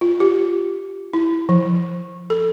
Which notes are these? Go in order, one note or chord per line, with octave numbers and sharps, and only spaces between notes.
F4
G4
E4
F3
A4